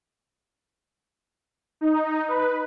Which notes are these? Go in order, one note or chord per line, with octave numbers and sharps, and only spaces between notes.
D#4
B4